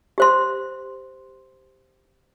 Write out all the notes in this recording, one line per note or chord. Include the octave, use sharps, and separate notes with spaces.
G4 C5 C6